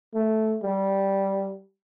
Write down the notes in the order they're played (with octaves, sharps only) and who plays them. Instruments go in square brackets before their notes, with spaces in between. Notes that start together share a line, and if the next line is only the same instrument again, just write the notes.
[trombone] A3
G3